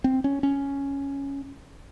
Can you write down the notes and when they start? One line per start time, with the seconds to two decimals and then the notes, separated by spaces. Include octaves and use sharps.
0.04 C4
0.24 C#4
0.43 C#4